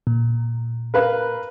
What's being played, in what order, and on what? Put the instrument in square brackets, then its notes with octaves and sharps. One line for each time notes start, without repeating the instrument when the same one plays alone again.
[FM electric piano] A#2
[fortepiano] A#4 B4 F5